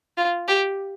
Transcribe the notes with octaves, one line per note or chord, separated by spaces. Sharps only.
F4
G4